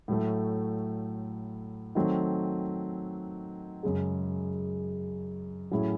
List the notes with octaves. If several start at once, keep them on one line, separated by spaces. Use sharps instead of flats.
A2 F#3 A3
D#3 F#3 A3 C4
F#2 C#3 G#3
A2 F#3 C#4 E4 G#4